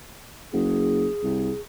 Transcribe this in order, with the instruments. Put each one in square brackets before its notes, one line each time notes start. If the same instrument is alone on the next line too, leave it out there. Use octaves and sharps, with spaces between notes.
[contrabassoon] F#1 [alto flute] G#4
[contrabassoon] C2